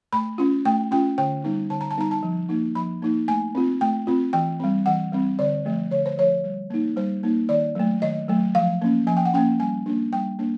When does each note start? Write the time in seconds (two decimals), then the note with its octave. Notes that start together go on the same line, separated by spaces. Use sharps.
0.13 A3 B5
0.38 C#4 F4
0.65 A3 G5
0.91 C#4 F4 G5
1.18 D3 G5
1.44 G3 B3 D#4
1.70 D3 A5
1.81 A#5
1.91 A5
1.97 G3 B3 D#4 A#5
2.11 A5
2.23 F3
2.49 A#3 D#4
2.75 F3 B5
3.02 A#3 D#4
3.28 A3 G#5
3.55 C4 F4
3.81 A3 G5
4.07 C4 F4
4.33 E3 G5
4.60 G3 C4
4.86 E3 F#5
5.12 G3 C4
5.39 D3 D5
5.66 F3 A3
5.91 D3 C#5
6.06 C5
6.18 F3 A3 C#5
6.44 G3
6.70 A#3 D#4
6.97 G3 C5
7.23 A#3 D#4
7.49 D#3 D5
7.75 F#3 A3
8.02 D#3 D#5
8.28 F#3 A3
8.55 F3 F5
8.82 A#3 C#4
9.07 F3 G#5
9.17 G5
9.25 F#5
9.34 A#3 C#4 G5
9.60 G3 G#5
9.86 A#3 D4
10.13 G3 G5
10.39 A#3 D4